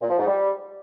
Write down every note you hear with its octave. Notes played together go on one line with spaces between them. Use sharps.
A#2
F3
G#2
G3